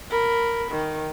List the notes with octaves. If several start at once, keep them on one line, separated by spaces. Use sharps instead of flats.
A#4 B5
D#3